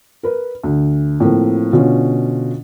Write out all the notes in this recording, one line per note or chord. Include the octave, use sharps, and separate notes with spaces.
A#4 B4
D2
A2 F3 A#3 C4
B2 D3 C#4 F4